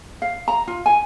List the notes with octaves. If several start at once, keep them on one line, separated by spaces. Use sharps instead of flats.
F5
A#5
F4
G#5